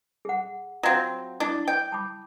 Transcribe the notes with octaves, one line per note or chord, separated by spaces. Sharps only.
G#4 F#5
F#3 C4 F4 F5 F#5
D4 E4 D6
G5
A5 B5 D6